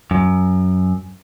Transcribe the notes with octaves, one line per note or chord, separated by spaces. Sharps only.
F#2